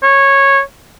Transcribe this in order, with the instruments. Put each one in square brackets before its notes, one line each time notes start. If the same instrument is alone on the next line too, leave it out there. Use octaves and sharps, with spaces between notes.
[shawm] C#5